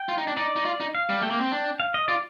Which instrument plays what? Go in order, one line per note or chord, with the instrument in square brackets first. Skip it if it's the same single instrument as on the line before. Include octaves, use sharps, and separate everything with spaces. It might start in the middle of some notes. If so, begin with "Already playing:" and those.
Already playing: [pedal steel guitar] G5
[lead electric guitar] F4
D#4
D4
[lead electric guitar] D#4 [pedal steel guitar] D5
[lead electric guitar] D#4
F4
D#4
[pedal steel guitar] F5
[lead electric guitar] G3
[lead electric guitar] A3 [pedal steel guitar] G5
[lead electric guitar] A#3
C4
D4
[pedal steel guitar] F5
D#5
[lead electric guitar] F4 [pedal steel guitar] D5